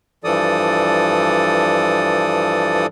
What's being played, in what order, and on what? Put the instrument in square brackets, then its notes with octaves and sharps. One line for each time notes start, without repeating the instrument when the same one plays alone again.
[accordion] G2 E3 F3 A4 D5 D#6